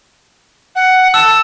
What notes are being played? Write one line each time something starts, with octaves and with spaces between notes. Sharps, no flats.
F#5
A5 E6